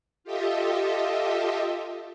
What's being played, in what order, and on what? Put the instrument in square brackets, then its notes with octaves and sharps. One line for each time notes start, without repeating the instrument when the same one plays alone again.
[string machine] F4 G4 A4 D#5 E5